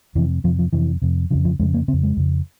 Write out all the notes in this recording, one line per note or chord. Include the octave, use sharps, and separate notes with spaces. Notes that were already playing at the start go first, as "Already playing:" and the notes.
F2 C3 E3
F2 C3 F3
F3
F2 C3 E3
F2 C3
F2 C#3 F3
F3
F2 C#3 G#3
A#3
C#3 C4
F2
G#3
F2 C#3